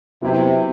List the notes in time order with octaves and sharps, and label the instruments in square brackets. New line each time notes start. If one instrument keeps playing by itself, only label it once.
[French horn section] C3 [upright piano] F#3 B3 E4 G4